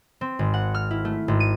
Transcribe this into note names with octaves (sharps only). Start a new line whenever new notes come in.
C4
G#1
F#5
F6
E4
A3
G#1
D#7